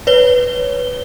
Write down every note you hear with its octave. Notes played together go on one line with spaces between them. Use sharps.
B4 C#5 G7